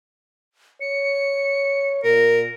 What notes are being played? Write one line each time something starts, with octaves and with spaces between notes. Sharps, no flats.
C#5 C#7
A#2 A#4